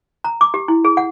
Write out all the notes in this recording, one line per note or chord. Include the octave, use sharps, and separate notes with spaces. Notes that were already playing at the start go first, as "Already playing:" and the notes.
A#5
D6
G4
E4
G#4
F#5